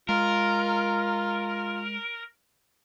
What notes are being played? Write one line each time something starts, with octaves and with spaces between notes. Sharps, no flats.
G#3 F4 A#4